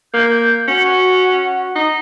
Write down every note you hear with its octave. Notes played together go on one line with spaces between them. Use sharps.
A#3 G6
C#4 F#4 F#5
D#4